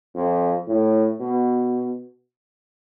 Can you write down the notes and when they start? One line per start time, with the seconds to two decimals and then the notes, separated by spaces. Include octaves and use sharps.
0.15 F2
0.67 A2
1.20 B2